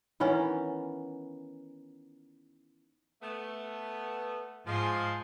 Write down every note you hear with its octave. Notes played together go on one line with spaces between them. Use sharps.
D#3 E3 B3 C#4
A3 B3
G#2 F3 G#3 G#5 C6